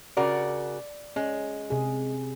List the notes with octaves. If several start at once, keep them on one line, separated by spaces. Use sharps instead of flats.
C#3 F#4 A#4 D5
G#3 C#4
C3 G#4